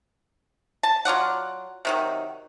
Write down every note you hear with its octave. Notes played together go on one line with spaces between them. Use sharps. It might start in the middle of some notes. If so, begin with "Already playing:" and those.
A5
F#3 F4 D5 F#5
C3 D#3 F#3